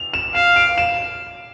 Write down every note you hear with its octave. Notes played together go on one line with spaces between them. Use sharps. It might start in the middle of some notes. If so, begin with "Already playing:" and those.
Already playing: F7
E7
F5 E7
D7
E7